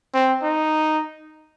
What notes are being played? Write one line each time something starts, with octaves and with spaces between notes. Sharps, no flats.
C4
D#4